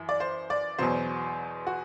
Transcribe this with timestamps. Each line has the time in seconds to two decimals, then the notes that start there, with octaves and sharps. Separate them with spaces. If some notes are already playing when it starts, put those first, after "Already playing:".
Already playing: F#2 E3
0.09 D5
0.20 C5
0.50 D5
0.79 E2 B2 F#3 C5
1.67 F#4